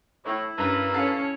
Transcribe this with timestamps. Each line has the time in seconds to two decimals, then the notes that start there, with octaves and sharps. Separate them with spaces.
0.25 A2 E4
0.58 G2 C#4 A#4 B4 E5 A#5
0.94 C#4 A4 C#5 F5